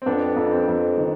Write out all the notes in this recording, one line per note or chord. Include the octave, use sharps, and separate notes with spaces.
C4
F2 B3 D4
F2
C4
F2
D#3